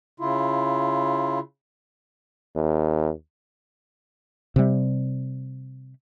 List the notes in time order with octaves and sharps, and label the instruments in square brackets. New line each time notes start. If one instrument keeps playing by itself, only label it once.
[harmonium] C#3 E4 F4
[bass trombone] D#2
[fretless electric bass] C3 G3